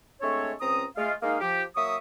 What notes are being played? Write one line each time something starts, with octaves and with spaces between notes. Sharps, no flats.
G#3 A3 C4 D4 A4 C#5
C#2 C4 C#4 A#5 D#6
G#3 A3 F4 F5
G#3 A#3 D#4 G#4 D#5 F5
F3 G4
F#3 A#3 E5 C#6 D#6